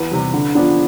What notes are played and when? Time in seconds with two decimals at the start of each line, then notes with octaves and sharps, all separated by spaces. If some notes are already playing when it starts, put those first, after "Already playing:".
Already playing: E2 B4
0.11 C3 E3 G3
0.34 D3
0.55 F3 B3 D4